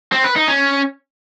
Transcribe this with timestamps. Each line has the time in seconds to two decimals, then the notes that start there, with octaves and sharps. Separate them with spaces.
0.12 C4
0.24 B4
0.36 D#4
0.48 C#4